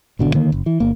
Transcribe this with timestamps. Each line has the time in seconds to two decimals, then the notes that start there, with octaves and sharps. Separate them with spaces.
0.19 G#1 B2 D3
0.34 D3 D#3 A#3
0.52 F#1
0.66 E3
0.80 G1 A#3